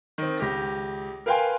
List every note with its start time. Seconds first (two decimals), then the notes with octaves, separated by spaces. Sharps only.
0.18 D#3 C4
0.38 C#2 G4 A#6
1.26 A#4 B4 F5 G5 G#5 C6